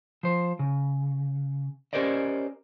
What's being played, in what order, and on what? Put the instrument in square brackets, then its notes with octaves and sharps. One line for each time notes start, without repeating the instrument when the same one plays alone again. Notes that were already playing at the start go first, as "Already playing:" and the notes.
[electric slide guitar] F3 C5
C#3
C#4 G4 A#4 C5 D5 D#5